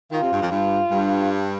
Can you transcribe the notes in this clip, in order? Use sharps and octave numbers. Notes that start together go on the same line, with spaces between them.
D#3 F4
C3
G2
F2
G2 F4
G2